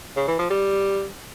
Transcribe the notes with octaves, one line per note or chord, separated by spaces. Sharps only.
C#3
E3
F3
G3